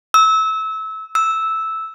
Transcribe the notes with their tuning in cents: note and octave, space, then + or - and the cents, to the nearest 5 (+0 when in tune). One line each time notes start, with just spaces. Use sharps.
E6 -25
E6 -10